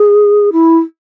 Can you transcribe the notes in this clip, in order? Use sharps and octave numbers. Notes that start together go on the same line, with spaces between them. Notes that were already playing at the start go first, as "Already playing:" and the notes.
Already playing: G#4
E4